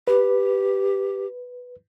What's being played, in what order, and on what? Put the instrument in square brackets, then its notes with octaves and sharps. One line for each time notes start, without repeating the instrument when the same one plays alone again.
[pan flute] G4 [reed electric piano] B4